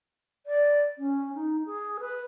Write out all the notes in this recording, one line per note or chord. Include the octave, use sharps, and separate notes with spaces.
D5
C#4
D#4
G#4
B4